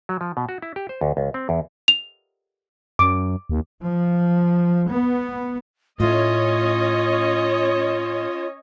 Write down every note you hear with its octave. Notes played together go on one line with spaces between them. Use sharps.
F#3
F3
B2
F#4
E4
G4
C5
D2
C#2
C4
E2
F7
F#2 D6
D#2
F3
B3
A2 A3 C#4 F4 C#5 D#5